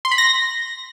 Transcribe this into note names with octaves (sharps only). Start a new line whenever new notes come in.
C6
B5
A#6